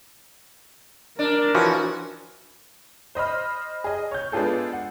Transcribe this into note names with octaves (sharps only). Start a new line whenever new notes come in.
D4 A#4
E3 F3 C#4 F#4
C5 D#5 B5 F6
G#4 D#5
C#5 G6
G#3 B3 D4 F4 G#4 A4
F#5